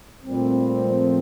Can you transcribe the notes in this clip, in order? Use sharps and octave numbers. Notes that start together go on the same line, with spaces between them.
A#2 G3 A3 C4
F3